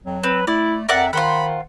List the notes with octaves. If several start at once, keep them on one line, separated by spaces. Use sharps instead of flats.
F2 F#3
C4 B4
A3 E4 D5
F2 A#4 D5 E5 F#5
D#3 F4 C5 F#5 B5